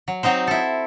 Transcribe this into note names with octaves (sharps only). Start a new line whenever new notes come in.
F#3
F#3 C4 D#4 C5
E4 A4